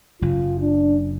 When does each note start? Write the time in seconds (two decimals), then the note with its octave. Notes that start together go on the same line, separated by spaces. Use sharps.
0.21 F#1 F#2 C#3 F#3 F4
0.60 D4